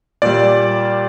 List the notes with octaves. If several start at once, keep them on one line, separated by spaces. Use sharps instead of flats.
A#2 G3 D5